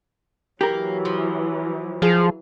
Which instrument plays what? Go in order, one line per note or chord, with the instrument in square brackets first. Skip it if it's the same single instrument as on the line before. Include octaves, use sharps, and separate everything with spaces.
[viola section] E3 F#3 [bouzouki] A#3 [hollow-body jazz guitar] G4 A#4
[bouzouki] F3
[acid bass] F3 [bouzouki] G#4 F5